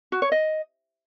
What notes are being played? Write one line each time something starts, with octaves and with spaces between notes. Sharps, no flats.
F#4
C#5
D#5